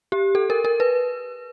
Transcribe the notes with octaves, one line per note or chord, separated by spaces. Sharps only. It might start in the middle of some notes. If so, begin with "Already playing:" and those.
G4
A4
A#4
A#4
B4